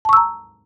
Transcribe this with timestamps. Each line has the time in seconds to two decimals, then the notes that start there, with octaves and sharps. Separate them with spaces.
0.05 A5
0.09 C#6
0.13 E6
0.17 A#5